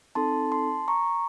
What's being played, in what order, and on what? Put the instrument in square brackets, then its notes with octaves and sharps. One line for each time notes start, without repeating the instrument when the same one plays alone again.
[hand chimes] C4 D#4 A4 A5 C6
A5 C6
A#5 C#6